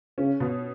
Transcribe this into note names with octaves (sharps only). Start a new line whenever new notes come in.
C#3 C#4
B2